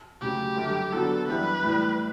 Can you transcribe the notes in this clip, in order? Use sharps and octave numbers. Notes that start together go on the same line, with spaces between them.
D2 C#3 F#3 G4
F#2 D3 G3
D3 F#3 B3 D4 F#4 A4
F#2 E3 G3 D4 G4 B4
A2 E3 G3